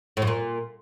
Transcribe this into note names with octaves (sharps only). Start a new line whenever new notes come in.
A2
F#2
A#2